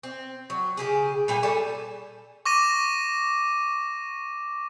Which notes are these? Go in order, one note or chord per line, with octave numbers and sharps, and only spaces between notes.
C4
F#3
C#3 G4 G#4
A#2 G3 A4 G#5
G3 A4 G#5 A5
C#6 D6 A#6 D#7